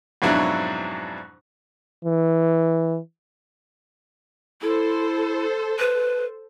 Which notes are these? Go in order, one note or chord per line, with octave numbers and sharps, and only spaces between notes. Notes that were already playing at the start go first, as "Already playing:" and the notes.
F2 G#2 B2 F#3 D4 E4
E3
E4 A4 C5
B4